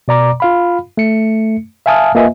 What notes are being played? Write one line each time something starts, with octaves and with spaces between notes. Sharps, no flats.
B2 D5 A#5 D6
F4 F5 B5
A3 C#7
E5 F5 G#5 A5 D#6 F6
A#3 F4 B4 D#5 E5 G#5